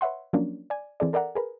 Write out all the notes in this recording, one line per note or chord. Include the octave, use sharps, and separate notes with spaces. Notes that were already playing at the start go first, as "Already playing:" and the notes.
B4 C#5 E5 F#5 C6
F3 F#3 A#3 C#4 D4
D5 G#5
E3 C4 G#4 A4 D5
A4 A#4 D5 E5 F#5 A#5
G#4 A#4 B4